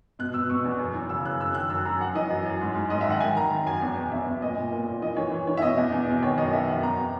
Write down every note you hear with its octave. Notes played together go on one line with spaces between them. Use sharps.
B2 F#6
B2 E6
B2 C#6
E2
F#2
E3
C#3 E6
F#2 F#6
F#2 E6
D#3 F#6
F#2 E6
F#2 A#5
F#2 F#5
E3 D#5
F#2
F#2
G#2
G#2
G#2 D#5
E5
D#3 F#5
D#3 G#5
D#3 A#5
D#3 A#5
F#2 G#5
E2
B2
E2 E5
B2
A#2 D#5
A#2
A#2
A#2
E3 D#5
E3 C#5
E3
E3 C#5
E5
B2 D#5
E2
E2
B2
D#3 C#5
F#2 D#5
D#3 E5
F#2 F#5
E2 A#5